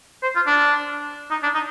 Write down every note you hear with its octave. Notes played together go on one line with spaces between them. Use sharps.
C5
F4
D4
D#4
D4
D#4